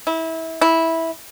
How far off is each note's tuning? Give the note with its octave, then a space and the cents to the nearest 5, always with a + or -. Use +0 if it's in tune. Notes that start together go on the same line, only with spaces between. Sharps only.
E4 -25
E4 -10